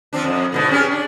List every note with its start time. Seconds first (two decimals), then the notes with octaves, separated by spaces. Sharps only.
0.13 F3 C4 D4
0.24 F2
0.52 G#2 B2 D3
0.71 C#4 G4 G#4
0.91 D4